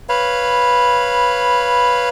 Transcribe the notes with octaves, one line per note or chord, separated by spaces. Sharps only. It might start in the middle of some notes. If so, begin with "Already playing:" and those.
B4 C#5 F5 B5